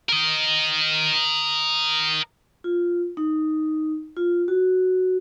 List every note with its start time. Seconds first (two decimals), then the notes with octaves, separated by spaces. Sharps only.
0.09 A#4 D#5
2.64 F4
3.17 D#4
4.17 F4
4.48 F#4